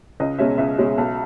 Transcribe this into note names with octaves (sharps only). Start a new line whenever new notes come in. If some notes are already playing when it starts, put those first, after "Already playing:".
C#2 D#5
B2 G#3 C#4 E5
C#2 E5
B2 G#3 C#4
B1